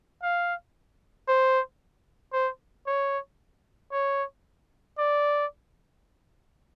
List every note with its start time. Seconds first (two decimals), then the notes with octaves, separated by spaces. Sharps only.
0.23 F5
1.28 C5
2.33 C5
2.87 C#5
3.92 C#5
4.98 D5